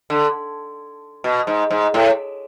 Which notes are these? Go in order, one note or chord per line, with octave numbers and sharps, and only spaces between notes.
D3
B2
G#2
G#2
A2